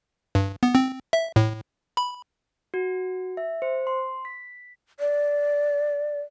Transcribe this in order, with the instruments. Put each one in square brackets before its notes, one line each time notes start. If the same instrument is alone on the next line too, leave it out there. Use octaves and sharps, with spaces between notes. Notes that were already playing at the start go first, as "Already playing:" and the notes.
[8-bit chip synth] G2
B3
C4
E5
A2
B5
[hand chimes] F#4
E5
C5
C6
B6
[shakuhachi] D5